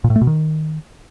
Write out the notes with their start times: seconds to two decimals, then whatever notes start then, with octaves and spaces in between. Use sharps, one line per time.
0.04 A#2
0.10 A2
0.16 A3
0.21 B2
0.27 D#3